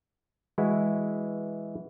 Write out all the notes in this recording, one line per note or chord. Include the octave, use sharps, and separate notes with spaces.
E3 G#3 E4 F#4